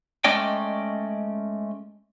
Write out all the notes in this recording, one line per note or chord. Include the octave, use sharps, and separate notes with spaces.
G#3 A3 C#4 D5 D#5 G5